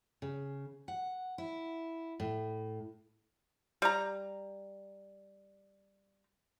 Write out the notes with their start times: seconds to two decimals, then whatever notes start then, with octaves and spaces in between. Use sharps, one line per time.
0.22 C#3
0.88 F#5
1.38 E4
2.20 A2
3.82 G3 A#5